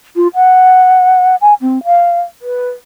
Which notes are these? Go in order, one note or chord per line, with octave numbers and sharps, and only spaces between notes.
F4
F#5
G#5
C4
F5
B4